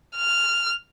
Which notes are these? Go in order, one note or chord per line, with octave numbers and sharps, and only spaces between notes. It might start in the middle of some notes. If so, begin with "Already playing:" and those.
F6